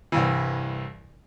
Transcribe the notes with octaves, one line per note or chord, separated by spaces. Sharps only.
C2 G2 E3